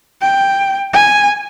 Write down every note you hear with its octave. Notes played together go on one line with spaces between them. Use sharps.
G5
G#5